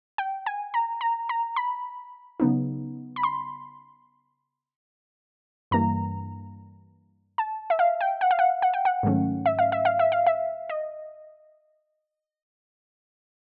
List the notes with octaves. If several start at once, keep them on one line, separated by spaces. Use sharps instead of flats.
G5
G#5
A#5
A#5
A#5
B5
C#3 F#3 B3 D#4
B5
C6
G2 E3 G3 A#3 A#5
A5
E5
F5
G5
F#5
F5
F#5
F#5
G5
F#5
G#2 D#3 F#3 A3 C#4
E5
F5
E5
F5
E5
F5
E5
D#5